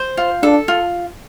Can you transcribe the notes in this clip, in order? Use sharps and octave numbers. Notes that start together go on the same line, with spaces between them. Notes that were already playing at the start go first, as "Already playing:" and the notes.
Already playing: C5
F4
D4 A4
F4